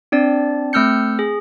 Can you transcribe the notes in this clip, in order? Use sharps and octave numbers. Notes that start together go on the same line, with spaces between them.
C4 D4 D5
A3 C4 E6 F6 G6 C#7
G#4